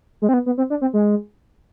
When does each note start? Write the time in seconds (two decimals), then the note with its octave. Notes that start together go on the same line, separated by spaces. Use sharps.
0.22 G#3
0.29 C4
0.34 B3
0.46 B3
0.58 C4
0.70 D4
0.81 C4
0.94 G#3